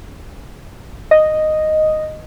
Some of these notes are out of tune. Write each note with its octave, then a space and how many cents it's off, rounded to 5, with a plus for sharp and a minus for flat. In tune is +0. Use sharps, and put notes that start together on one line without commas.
D#5 -5